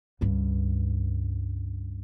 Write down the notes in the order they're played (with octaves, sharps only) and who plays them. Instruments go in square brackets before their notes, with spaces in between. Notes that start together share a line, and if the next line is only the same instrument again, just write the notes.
[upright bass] C#2 G2